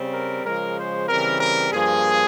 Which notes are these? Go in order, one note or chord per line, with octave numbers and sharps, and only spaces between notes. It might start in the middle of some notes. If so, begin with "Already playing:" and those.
Already playing: C#3 G3 C4
A#4
C#3 F3 G#3 A#4
C5
C#3 E3 G3 C4 A#4
A#4
G2 F3 A#3 G#4